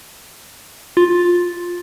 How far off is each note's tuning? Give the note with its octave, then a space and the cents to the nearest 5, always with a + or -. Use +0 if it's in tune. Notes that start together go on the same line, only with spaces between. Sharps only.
F4 +10